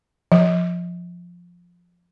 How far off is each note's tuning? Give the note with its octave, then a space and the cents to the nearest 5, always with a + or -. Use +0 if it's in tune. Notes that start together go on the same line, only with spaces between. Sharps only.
F3 +5 D5 -20